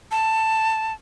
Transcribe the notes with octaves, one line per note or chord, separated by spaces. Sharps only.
A5